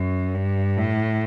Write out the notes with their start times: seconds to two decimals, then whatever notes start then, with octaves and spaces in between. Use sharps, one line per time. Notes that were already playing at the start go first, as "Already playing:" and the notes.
Already playing: F#2
0.34 G2
0.77 A2